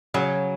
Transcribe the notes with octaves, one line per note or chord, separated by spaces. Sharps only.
C#3 F#3